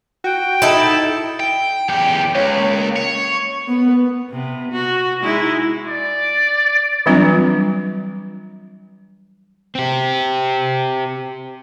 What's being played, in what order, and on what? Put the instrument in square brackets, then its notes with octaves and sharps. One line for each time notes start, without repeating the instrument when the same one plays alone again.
[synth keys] F#4 [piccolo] G5
[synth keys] D#4 E7 [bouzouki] E4 A4
[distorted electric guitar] G5
[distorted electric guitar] E2 G4 [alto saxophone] G5
[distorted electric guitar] C#2 [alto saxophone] C#5
[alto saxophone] A#3
[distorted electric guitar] C#5
[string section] B3
[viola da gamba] C3 B3
F#4
G#3 D#4 E4
[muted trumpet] D5
[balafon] E3 F#3 G3 C4 D4 F4
[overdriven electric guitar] C4 G4